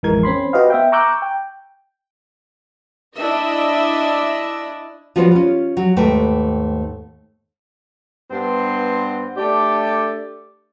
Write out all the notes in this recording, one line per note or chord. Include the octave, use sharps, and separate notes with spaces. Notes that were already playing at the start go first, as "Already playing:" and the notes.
A1 F2 E3 G#3 A#4 G#6
C4 C#4 B5 C6
F#4 G4 B4 C5 D#5 F5
B3 E5 G5
A#5 C#6 D6 E6 F#6 G6
G5
D4 E4 D#5 E5
F3 G3 B3 C#4 F#4 C5
C#4 F4
F#3
D#2 G#2 A3 B4 G5
G2 B3 C4 C6
A3 D4 G4 D5